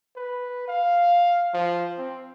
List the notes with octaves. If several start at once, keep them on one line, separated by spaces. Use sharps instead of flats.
B4
F5
F3
C4